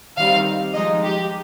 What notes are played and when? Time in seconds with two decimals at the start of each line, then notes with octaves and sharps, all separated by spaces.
0.16 D#3 G3 C4 D#4 F5
0.74 F3 G#3 D#4 D#5
1.02 G4